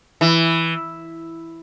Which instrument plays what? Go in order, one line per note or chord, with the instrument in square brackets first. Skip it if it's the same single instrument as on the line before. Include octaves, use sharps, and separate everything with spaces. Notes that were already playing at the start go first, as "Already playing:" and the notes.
[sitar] E3